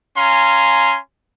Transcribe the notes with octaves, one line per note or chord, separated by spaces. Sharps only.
C#4 F5 G#5 A#5 C6